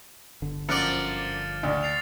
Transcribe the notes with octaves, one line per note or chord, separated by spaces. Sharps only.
G1 D3
F#2 F3 D5 F6 F#6 A6 C#7
D2 D4
A6 C7 F7